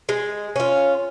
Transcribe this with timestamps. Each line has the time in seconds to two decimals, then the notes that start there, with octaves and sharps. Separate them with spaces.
0.09 G#3
0.56 C#4 F4